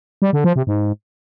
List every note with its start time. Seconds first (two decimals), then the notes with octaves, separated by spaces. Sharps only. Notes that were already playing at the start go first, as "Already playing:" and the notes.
0.22 G3
0.33 D3
0.44 F3
0.56 C3
0.67 G#2